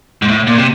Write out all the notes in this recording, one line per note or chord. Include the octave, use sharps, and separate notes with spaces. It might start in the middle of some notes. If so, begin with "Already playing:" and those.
G#2
A2
A#2
C3